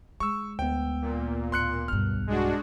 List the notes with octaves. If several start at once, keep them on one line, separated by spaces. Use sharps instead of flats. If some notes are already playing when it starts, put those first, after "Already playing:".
G#3 C#6 E6
D2 B3 G5
A#2
A2 C6 F#6 C#7
B1 G2 F6
G#3 D4 F#4